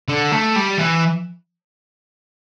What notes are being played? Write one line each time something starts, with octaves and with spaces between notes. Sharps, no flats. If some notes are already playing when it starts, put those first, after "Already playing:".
D3
A3
G3
E3